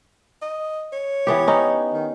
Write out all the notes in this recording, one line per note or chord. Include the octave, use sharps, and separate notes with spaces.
D#5
C#5
E3 B3 G4
C#4 D#4
D#3